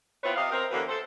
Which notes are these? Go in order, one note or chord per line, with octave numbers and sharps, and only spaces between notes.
B3 C4 E4 F4 B4 C#5
C3 G4 D#5 F5
C4 A#4
E2 D3 F#3 A#3 F#4 B4
A4 C5